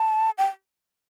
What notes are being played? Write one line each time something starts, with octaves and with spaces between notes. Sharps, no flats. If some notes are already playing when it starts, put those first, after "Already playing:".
Already playing: A5
G5